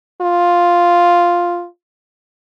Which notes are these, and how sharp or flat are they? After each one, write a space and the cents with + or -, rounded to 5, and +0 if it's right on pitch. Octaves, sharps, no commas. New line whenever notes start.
F4 +0